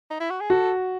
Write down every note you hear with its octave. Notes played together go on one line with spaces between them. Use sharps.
D#4
E4
F#4
G#4
F#4 A4